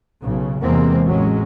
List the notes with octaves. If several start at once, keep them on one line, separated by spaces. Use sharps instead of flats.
B1 C#3
E2 C3 E3 G#3 A#3 C4
A1 F#3 G#3 C#4